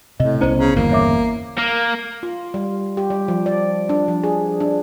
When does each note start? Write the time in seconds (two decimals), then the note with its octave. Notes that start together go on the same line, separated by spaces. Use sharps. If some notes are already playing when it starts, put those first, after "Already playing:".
0.20 A2 C3 D#5
0.41 C2 B3 C#4 E4 C5 D5
0.59 C#3 A#5
0.76 G1 E2 C#3 A#3
0.91 C#5 E5 D6
1.58 A#3
2.23 F4
2.54 G3
2.97 G4
3.10 G3
3.28 F3
3.46 D5
3.89 D4
4.08 F3
4.23 G#4
4.60 D4